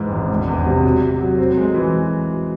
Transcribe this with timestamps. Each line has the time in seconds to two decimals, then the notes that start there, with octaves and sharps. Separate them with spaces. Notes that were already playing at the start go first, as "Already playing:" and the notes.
Already playing: G#2 E3
0.12 G#1
0.30 E1
0.48 E2
0.66 C3
0.84 F#3
1.02 F#3
1.21 F#3
1.38 C4
1.57 G#3
1.74 E3